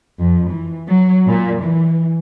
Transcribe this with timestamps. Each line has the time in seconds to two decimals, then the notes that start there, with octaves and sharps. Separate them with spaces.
0.19 F2
0.51 E3
0.88 F#3
1.26 A#2
1.61 E3